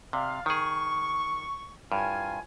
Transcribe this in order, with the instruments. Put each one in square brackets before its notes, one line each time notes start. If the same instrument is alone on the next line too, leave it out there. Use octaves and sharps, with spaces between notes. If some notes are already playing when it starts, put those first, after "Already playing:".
[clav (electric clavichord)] C3 [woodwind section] D5 F5
[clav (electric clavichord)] D#3 G#4 [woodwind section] C#6
[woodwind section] C2 F4 G#5 [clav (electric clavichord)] G2